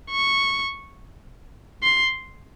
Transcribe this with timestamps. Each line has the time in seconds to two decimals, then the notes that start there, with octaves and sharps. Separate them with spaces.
0.10 C#6
1.83 C6